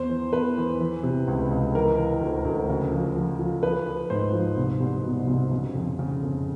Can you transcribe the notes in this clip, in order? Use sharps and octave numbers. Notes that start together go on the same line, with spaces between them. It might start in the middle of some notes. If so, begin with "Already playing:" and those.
Already playing: E2 C5
E3
E2 B4
E3
E3
C3
C#2
C#2
E3 A#4
E3
D2
D2
C#3
F3
F3
F3
F3 B4
F3
G#2 C5
F3
C2
C2
B2
C2
C#3
F2
C#3
F2